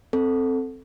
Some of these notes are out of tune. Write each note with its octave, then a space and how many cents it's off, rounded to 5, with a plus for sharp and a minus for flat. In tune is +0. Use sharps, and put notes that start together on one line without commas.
C4 +0 A4 +0